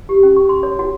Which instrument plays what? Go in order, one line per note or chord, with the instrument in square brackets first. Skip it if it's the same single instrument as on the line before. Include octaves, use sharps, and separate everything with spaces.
[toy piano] G4
C#4
C#6
C6
C#5
F#4